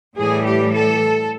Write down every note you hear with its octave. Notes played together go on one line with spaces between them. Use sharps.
A2 E3 G3 G#4
G4
A4